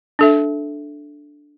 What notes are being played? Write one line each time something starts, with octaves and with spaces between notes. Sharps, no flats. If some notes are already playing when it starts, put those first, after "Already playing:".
D4 A4 E5